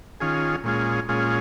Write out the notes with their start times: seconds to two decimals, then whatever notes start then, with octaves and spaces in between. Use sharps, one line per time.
0.20 D#3 C#4 F4 G#4
0.64 A#2 G#3 C#4 F4 G#4
1.09 A#2 G#3 C#4 F4 G#4